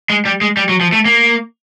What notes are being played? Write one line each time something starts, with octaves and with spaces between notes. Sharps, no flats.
G#3
G3
G#3
G3
F#3
F3
A3
A#3